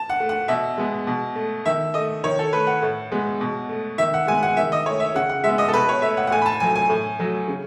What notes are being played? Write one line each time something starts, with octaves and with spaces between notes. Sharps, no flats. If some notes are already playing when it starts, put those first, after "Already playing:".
Already playing: A5
F#5
A3
F#5
B2 E5
G#3 B3
B2
A3
D#3 E5
A3 D#5
D#3 C#5
A4
A3 B4
F#5
A2
G#3 B3
B2
A3
D#3 E5
F#5
G#3 B3 G#5
F#5
D#3 E5
D#5
A3 C#5
E5
C#3 F#5
F#5
G#3 E5
B3
D#5
A4
B2 B4
C#5
A3 E5
F#5
F#5
A2 G#5
B5
A5
F#3 A3 G#5
G#5
A2
F#3 A3
C#3